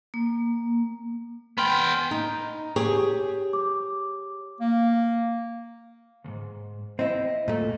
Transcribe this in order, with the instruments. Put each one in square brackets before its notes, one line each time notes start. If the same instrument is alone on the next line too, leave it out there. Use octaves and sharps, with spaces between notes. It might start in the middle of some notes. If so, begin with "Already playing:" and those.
[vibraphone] A#3
[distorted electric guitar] B3 G5 [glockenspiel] B5 C6 F6
[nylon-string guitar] D#4
G4 G#4 C#5
[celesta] D6
[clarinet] A#3
[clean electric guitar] D2 G#2
[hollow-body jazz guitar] C4 E4 [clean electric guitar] D#5
[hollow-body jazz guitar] A#2 A3